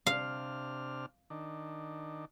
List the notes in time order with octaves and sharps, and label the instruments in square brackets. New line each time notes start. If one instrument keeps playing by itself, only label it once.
[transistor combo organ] C3 D4 F6 [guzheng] F5
[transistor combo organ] D#3 D4